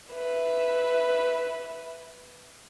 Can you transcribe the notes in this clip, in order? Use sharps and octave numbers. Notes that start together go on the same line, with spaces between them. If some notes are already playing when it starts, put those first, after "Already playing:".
B4 E5